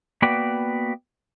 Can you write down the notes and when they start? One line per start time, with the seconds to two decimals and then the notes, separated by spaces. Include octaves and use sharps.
0.22 A#3 B3 F#4 B4 D5 G5